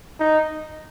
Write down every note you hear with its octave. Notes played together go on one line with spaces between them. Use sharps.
D#4